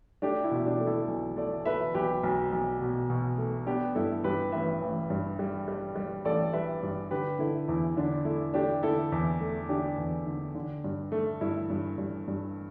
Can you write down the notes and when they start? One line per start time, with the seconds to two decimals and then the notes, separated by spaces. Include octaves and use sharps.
0.22 A3 D4 G4
0.44 E4
0.51 B2
0.66 D4 G4
0.80 A3
0.87 E4 A4
1.08 B1
1.37 A3 A4 D5
1.65 A3 B4 E5
1.95 B1 G4 B4
2.23 B1
2.52 B1
2.81 B2
3.10 B2
3.38 A3
3.66 B3 D4 G4
3.95 G2 E4 A4
4.24 G2 G4 B4
4.52 A1 B4 E5
4.82 A1
5.10 G2
5.39 G3
5.68 G3
5.96 G3
6.25 A1 A4 D5
6.53 G3 B4 E5
6.83 G2
7.11 D3 G4 B4
7.39 D3 E4 A4
7.68 E2 E4
7.97 D3 D4
8.25 A3 E4
8.54 A3 D4 G4
8.83 D3 E4 A4
9.12 E2
9.41 A3
9.69 D3 D4 G4
9.98 E2
10.27 D3
10.55 D3
10.84 G2
11.12 A3
11.41 G2 E4
11.70 G2
11.98 G2
12.28 G2